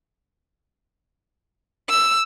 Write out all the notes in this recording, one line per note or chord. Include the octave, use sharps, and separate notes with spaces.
E6